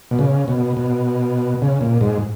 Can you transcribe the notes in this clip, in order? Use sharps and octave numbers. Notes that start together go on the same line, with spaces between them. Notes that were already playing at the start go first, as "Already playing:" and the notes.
B2
C#3
B2
B2
C#3
A#2
G#2